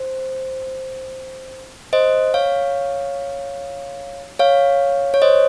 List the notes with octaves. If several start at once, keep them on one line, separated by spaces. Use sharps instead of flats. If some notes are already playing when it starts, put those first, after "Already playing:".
Already playing: C5
C5 D#5
C#5 F5
C#5 F5
C#5
C5 D#5